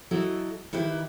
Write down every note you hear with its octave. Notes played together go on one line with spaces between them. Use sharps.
F#3 E4 A4 D#5
D#3 E4 G4 B4